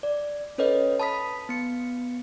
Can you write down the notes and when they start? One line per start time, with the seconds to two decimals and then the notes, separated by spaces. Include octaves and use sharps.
0.03 D5
0.58 C#4 A4 B4 C#5 D#5
0.99 A5 B5 D#6 B6
1.49 B3 C#7